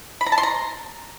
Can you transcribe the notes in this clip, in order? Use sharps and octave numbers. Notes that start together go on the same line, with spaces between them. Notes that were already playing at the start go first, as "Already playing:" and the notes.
B5
A#5
A5
C6
A#5